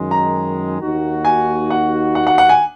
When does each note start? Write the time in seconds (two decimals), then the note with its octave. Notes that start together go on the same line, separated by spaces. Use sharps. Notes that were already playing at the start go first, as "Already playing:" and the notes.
Already playing: F#2 D#3 G#3
0.11 A#5
0.79 D#2 D#3 A#3 D#4 F#4
1.25 G#5
1.70 F#5
2.15 F#5
2.27 F#5
2.38 F#5
2.49 G#5